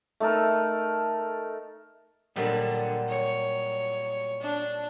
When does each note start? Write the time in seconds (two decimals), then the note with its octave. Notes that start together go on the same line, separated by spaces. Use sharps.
0.20 A3 D#4 A4 A#4
2.36 A#2 D3 F#3 G3
3.09 C#5
4.41 D4